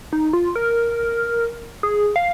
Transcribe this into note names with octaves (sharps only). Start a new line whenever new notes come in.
D#4
F4
A#4
G#4
F5